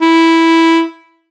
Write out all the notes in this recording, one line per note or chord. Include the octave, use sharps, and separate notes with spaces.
E4